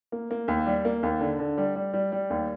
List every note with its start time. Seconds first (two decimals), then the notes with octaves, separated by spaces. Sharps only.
0.12 A#3
0.31 A#3
0.48 D#2
0.67 G3
0.85 A#3
1.03 D#2
1.21 D3
1.39 D3
1.58 G3
1.76 G3
1.93 G3
2.12 G3
2.30 D#2